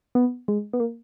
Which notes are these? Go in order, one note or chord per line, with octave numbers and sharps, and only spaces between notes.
B3
G#3
B3
A#3